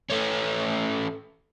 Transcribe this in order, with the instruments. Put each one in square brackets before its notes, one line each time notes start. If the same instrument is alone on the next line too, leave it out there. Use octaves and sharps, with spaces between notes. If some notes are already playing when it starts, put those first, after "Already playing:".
[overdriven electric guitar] A3 C#4